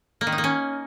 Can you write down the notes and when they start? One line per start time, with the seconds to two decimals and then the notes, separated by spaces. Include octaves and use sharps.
0.21 A#3
0.27 D#3
0.32 D#4
0.38 A#3
0.44 C#4